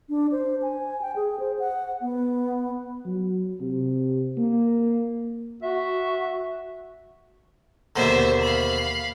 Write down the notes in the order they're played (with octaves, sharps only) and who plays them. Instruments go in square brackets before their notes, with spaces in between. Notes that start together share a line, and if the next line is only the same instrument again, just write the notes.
[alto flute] D4
C5
G#5
G5
G#4
C5
F#5
B3
[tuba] F#3
C3
A#3
[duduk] F#4 [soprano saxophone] E5
[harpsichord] D#2 B2 D3 [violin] C5 E5
[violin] F5 B5